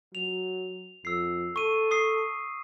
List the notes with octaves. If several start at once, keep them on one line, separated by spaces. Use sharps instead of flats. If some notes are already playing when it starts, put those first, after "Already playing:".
F#3 F7
F2 E6 C7
A4 C#6 D#7
C#6 D#6 C7